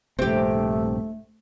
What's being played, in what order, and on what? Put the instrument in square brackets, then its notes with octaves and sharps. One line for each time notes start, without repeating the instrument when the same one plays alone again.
[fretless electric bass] A#1 G2 C3 [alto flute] A3 [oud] C4 G4